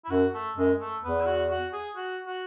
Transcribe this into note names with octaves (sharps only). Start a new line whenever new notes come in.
E4
F#2 F#4
A3
F#2 G#3
A3
E2 B3
E4
F#4
F#4
G#4
F#4
F#4